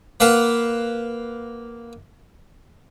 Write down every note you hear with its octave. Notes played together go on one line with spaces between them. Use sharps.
A#3 B4 F5 F#5 A5